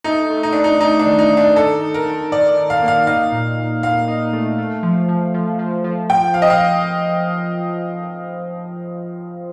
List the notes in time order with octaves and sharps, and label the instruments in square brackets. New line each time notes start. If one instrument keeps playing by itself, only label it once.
[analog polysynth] A3 [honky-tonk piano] D#4
[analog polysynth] A3
[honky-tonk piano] D#4
[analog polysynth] A3 [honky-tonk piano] D4
[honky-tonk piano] D#4
[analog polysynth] A3 [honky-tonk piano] D#4
[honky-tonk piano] D4
[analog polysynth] D#3
[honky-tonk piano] D#4
[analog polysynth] D#3
[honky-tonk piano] D4
[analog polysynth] D#4 [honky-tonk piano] A4
[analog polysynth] D#4
[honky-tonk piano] A#4
[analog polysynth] D#3
[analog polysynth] D#3 [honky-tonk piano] D5
[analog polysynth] D#3
[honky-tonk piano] F5
[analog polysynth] A#3
[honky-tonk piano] F5
[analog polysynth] D#4 [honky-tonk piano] F5
[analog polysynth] A#2
A#2
[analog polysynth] A#2 [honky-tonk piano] F5
[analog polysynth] D#4
A3
A3
F3
F3
F3
F3
F3
[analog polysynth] F3 [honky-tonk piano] G5
[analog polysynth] F3 [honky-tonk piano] F5
[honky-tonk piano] D#5
F5